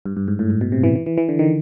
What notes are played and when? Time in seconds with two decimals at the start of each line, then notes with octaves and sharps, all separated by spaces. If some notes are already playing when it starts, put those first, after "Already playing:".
0.06 G2
0.17 G2
0.28 G#2
0.39 A2
0.50 A2
0.61 B2
0.72 C3
0.83 E3
0.95 E3
1.06 E3
1.18 E3
1.29 D3
1.39 D#3